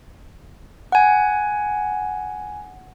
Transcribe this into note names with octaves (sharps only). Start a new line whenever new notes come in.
F#5 G#5